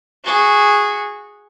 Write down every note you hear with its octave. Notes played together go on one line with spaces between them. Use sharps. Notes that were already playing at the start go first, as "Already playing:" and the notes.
F#4 G#4